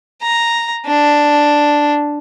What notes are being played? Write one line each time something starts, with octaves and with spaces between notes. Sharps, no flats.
A#5
D4